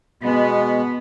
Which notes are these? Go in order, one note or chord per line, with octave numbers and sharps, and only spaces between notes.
B2 G#3 B3